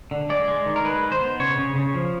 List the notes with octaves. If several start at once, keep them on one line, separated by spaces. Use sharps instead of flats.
D3
G#3 D5
G#3
D#3
A#4
G#3 B4
G#3
C5
B3
C#3 C#5
C#3
C#3
F3